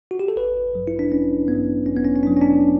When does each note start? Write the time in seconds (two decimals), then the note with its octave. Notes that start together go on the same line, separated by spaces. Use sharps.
0.11 F#4
0.19 G4
0.28 A4
0.36 A1 B4
0.73 G2 F#3
0.87 E4
0.99 D4
1.12 A1 C#4
1.48 G2 F#3 B3
1.85 A1 C#4
1.96 B3
2.05 C#4
2.16 C#4
2.23 G2 F#3 D4
2.37 C#4
2.41 D4